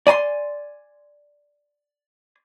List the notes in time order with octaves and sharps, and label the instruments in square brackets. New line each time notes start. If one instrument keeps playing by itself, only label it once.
[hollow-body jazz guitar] D5 G#5 A#5 C6